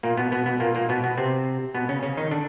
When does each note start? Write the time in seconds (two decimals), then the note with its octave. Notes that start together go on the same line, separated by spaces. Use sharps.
0.03 A#2 A#3
0.17 B2 B3
0.32 B2 B3
0.46 B2 B3
0.60 A#2 A#3
0.75 A#2 A#3
0.89 B2 B3
1.04 B2 B3
1.18 C3 C4
1.74 B2 B3
1.89 C#3 C#4
2.03 C#3 C#4
2.17 D#3 D#4
2.31 D3 D4